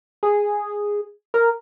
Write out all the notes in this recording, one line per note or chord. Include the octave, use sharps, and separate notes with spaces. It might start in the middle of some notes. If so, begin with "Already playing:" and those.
G#4
A#4